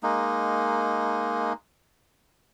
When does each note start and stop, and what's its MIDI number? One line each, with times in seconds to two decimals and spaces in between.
0.03 1.53 56
0.03 1.53 58
0.03 1.53 63